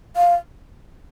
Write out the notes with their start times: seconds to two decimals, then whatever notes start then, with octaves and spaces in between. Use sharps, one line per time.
0.16 F5